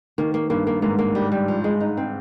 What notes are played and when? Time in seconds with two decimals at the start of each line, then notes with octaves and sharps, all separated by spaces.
0.18 D#3 A#3
0.34 A#3
0.50 G2 A#3
0.67 A#3
0.82 G#2 A#3
0.99 A#3
1.15 G3
1.32 G3
1.48 F3
1.64 G#3
1.80 D#4
1.97 C4